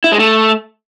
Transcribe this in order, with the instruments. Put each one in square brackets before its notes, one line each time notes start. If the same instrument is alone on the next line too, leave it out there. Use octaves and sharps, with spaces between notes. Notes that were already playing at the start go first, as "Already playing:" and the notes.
[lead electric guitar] E4
G#3
A3